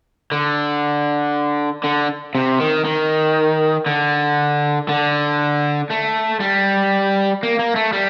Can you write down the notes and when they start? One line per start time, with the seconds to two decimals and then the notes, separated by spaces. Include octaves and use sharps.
0.32 D3
1.84 D3
2.35 C3
2.60 D#3
2.85 D#3
3.86 D3
4.89 D3
5.91 A3
6.40 G3
7.43 A#3
7.59 A#3
7.76 A3
7.93 G3